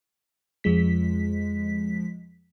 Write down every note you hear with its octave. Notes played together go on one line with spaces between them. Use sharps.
F2 F3 G#3 B6